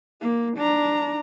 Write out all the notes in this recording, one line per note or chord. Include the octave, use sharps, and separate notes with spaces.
A#3
D4 A#5